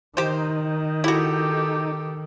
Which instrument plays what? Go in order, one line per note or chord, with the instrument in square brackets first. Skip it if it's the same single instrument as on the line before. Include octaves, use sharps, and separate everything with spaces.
[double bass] D#3 [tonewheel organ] D#4 [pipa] G4 C5
[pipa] E4 F#4 [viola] G4 A4